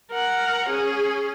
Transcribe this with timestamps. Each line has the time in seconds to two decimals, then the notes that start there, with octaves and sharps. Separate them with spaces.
0.11 A#4 F#5
0.69 C#4 G#4